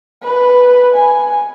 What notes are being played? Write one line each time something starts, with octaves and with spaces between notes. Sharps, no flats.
B4
G#5